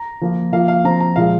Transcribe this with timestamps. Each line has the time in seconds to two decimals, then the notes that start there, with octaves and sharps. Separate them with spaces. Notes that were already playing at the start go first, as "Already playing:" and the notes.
Already playing: A#5
0.21 F3 A#3 F4
0.52 F3 A#3 F4 F5
0.68 F5
0.84 F3 C4 F4 A#5
1.00 A#5
1.16 A#2 F3 G#3 F5